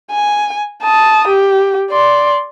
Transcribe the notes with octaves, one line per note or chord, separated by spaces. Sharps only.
G#5
A5 D#6
G4
D5 C6